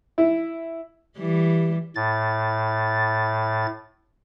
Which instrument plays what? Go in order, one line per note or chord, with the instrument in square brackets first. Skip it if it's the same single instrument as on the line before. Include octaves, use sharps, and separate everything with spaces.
[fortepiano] E4
[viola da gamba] E3 G3
[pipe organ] A2 A6